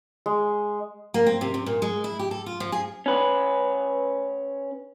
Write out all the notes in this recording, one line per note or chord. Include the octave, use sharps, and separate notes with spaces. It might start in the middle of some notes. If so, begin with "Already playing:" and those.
G#3
A#3
C4
C3
C3
A#2
G#3
E4
G4
A4
F4
F3
G#4
C#4 B4